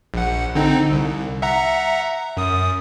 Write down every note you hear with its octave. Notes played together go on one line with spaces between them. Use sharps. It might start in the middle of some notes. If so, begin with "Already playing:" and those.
A#1 F#5
D3 C4 D#4
C2
E5 F#5 A#5
F#2 D#6